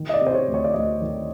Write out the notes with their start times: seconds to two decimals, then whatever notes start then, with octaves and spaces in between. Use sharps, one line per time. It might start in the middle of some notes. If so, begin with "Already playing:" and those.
Already playing: D#3
0.09 D#5
0.14 D5
0.21 C3
0.27 C5
0.34 C#5
0.48 D2
0.54 C#5
0.64 D5
0.74 D2 D#5
1.01 D#3